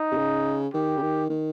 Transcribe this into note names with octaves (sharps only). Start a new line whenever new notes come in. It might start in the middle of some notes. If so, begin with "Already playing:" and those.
Already playing: D#4
C3
C#3
D#3 G4
C#3
D#3
D#3